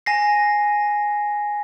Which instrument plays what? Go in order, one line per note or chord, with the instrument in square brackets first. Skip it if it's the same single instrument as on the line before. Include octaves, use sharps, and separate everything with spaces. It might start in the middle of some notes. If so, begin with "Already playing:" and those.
[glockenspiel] G#5 A#6 C7